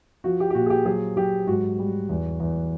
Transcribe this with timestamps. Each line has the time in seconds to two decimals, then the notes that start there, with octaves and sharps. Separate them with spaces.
0.24 F3 F#4
0.40 G4
0.50 G4
0.55 A#2 F#4
0.66 G#4
0.70 G4
0.85 F#3 G#4
1.17 F#3 G4
1.47 G#2 F#4
1.79 G3
2.09 E2
2.40 E2